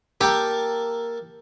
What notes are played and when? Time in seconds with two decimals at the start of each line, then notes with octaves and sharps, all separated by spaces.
0.21 A#3 G4 A4